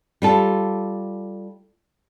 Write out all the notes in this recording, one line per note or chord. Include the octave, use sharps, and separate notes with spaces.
G3 F4 A4